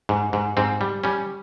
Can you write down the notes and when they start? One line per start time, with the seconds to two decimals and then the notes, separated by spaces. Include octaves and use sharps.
0.09 G#2
0.33 G#2
0.57 G#2 C4
0.81 G3
1.04 G3 C#4